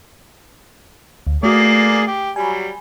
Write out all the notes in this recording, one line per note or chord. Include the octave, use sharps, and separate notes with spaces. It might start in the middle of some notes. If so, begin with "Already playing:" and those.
D2
A3 A#3 F#4 G#4 D5 D#6
G4
F#3 G3 G#5 B5